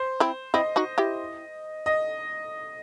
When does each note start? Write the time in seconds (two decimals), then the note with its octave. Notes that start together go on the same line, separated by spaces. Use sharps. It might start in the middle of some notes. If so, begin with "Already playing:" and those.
Already playing: C5
0.20 C4 E4
0.54 C4 E4 D#5
0.76 D#4 F#4
0.98 E4 G4
1.86 D#5